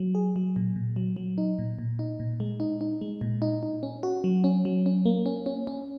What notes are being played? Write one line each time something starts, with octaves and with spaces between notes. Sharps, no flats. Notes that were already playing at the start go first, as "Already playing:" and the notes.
Already playing: F#3
G#4
F#3
A#2
A#2
F#3
F#3
D#4
A#2
A#2
D#4
A#2
G#3
D#4
D#4
G#3
A#2
D#4
D#4
C#4
F#4
F#3
C#4
F#3
C#4
A#3
C#4
C#4
C#4